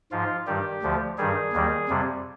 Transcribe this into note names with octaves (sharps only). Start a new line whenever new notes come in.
G#2 F3 F4
G2 D#3 G3 G4
D2 D3 F3
G2 D#3 G3 G#4
D#2 D#3 G3
F2 C3 G3